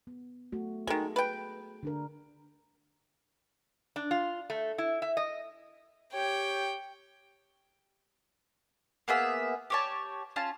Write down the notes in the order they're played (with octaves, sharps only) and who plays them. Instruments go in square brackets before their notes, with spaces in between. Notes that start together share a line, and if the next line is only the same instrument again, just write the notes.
[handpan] B3
A3 F#4
[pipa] D#3 G#3 [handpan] F#4 G#4 A4
[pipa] B4 G5
[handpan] D3 D4 A#4
[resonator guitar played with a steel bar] D4
F4
A3
E4
E5
D#5
[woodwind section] G4 C#5 [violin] G5
[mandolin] A#3 B3 G#4 E5
G4 C#5 A5
C#4 F4 A5